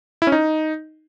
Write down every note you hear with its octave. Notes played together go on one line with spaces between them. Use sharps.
E4
C#4
D#4